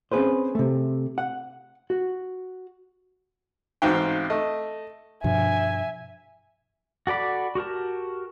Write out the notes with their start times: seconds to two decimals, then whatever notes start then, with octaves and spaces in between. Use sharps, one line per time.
0.12 C4 C#4 F4 G#4 B4 C5
0.55 C3 A3
1.18 F#5
1.90 F#4
3.82 A1 G#2 C4 F#4 F5 G5
4.30 A3 D#5
5.24 G2 B2 F3 E5 G#5
7.07 F#4 A4 D5 B5 D6
7.55 F#4 G4 A#4 A5